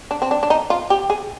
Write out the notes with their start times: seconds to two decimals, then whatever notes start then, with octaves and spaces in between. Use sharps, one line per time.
0.11 D4
0.22 C4
0.31 D4
0.43 D4
0.50 D#4
0.70 F4
0.90 G4
1.10 G#4